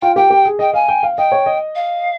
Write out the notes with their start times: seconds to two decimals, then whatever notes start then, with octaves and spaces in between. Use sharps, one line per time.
0.01 F4 G5
0.16 G4 G5
0.30 G4
0.45 G#4
0.59 D#5 G5
0.73 F5 G#5
0.88 G5
1.03 F5
1.17 D#5 G5
1.32 C#5
1.46 D#5
1.75 F5